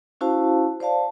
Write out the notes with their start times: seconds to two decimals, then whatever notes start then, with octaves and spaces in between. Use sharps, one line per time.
0.21 C#4 E4 F#4 C5 F5 A5
0.80 C5 D5 F5 A5